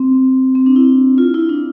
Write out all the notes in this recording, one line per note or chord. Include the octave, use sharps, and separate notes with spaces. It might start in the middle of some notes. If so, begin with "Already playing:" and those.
Already playing: C4
C4
D4
E4
F4
E4
D4